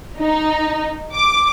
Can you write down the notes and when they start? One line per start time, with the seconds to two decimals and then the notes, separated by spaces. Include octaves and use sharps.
0.18 D#4
1.14 D6